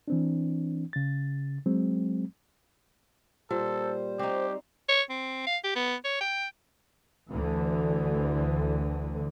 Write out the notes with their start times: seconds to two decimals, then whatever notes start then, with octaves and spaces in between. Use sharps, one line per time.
0.08 E3 C4 D4
0.93 C#3 A6
1.66 F#3 G#3 C4
3.51 A#2 G3 A4 C5
4.19 C4 D#4 G4
4.89 C#5
5.10 C4
5.47 F5
5.64 G4
5.76 B3
6.04 C#5
6.21 G5
7.30 D2 D3 E3